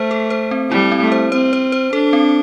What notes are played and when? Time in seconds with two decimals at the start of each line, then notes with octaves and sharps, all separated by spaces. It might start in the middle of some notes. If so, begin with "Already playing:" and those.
Already playing: A3 C5
0.11 A4
0.30 C5
0.51 C4
0.71 G3 E4
0.92 C4
1.02 A3
1.12 C5
1.32 C4 C5
1.53 C5
1.72 C5
1.93 D4 A4
2.13 C4